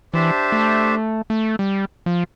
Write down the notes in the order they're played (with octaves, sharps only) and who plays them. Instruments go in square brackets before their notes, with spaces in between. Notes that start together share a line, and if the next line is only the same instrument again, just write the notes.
[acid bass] E3 [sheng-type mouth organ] D4 G4 C5 E5 A5
[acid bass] A3
A3
G3
F3